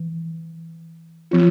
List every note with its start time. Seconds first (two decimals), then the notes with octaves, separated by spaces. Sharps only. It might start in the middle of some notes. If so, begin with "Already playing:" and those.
Already playing: E3
1.31 F3 C4 F4